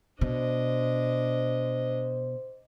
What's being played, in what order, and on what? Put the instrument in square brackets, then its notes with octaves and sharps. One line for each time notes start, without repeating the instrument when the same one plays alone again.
[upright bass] B2 [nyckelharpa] D4 D#5 [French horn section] C5